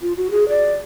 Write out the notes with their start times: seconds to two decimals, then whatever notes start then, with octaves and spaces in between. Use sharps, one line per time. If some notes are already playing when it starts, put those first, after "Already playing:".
0.01 F4
0.17 F#4
0.31 G#4
0.49 D5